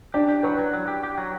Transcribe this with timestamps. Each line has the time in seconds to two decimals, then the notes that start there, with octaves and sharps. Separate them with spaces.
0.14 D4 G4 D5
0.29 G4
0.43 F#3 B4
0.58 F#3
0.73 F#3
0.88 G4
1.03 G4
1.18 F#3